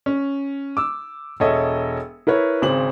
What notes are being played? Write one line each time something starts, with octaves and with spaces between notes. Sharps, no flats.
C#4
D6 E6
E1 A4 C#5 D#5 E5
E4 A#4 B4 C#5
G#1 C#3 C4 F#7